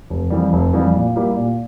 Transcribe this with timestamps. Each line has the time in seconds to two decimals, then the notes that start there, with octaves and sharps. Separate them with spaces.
0.10 F1
0.30 F2 E3 G3
0.53 F1
0.73 F2 E3 G3
0.95 A#2
1.16 G3 A#3 E4 G4
1.37 A#2